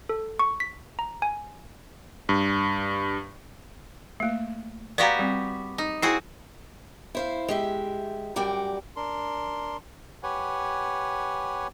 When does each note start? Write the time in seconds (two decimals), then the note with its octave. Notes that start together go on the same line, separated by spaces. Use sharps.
0.09 A4
0.39 C#6
0.60 B6
0.99 A#5
1.22 G#5
2.29 G2
4.20 A3 A#3
4.98 B3 F#4 G4 D5 F5 A#5
5.19 G3 C4
5.78 D#4
6.02 C4 E4 F#4 G#4
7.15 E4 C5 F5
7.48 G#3 G4 E5
8.36 F#2 G3 A#4 D5 G5
8.96 D4 A#4 C6
10.23 G4 B4 C#5 F#5 G#5